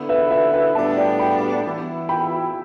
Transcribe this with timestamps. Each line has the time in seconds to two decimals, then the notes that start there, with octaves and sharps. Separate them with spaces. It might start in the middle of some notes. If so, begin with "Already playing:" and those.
Already playing: D3 B3 E4
0.09 B4 E5
0.30 B4 E5
0.53 B4 E5
0.75 A2 G3 B3 D4 E5 A5
0.97 D5 G5
1.19 G5 B5
1.65 E3 B3 E4
2.09 G5 B5